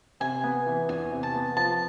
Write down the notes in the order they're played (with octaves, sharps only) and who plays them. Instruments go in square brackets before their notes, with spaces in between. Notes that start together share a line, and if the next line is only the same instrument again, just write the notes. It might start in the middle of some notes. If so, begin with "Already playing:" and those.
[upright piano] C3 [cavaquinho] G#5
[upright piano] B3
E3
[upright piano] E2 [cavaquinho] G#5
[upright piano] C3
[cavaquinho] A5
[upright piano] B3
[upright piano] F3 [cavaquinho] A5